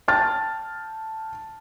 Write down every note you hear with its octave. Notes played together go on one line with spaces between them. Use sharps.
G5 A5 F6 A6